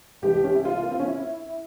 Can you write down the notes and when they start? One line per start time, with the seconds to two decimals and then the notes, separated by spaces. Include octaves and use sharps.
0.22 C2 C3 E3 G#3 G4
0.44 C#4
0.54 E4
0.65 F4
0.83 A#3
0.91 C4
1.00 C#4
1.07 E4